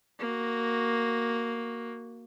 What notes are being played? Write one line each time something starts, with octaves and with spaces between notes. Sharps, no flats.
A#3 F#4